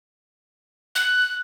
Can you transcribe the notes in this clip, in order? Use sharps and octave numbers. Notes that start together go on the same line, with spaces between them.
F#6